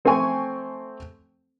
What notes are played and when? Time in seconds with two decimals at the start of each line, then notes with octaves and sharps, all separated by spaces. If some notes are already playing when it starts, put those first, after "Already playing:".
0.05 A3 C4 A4 G5 G#5 C#6